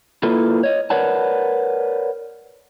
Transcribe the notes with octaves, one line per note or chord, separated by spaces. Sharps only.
A#3 E4 F4 A4 B4
C#5 D#5
A#4 B4 C#5 D5 F#5 A5